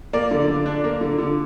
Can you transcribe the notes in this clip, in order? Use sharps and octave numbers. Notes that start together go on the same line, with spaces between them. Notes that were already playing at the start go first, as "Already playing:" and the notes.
A#3 D5
D3
D3
D4
A#3
D3
D3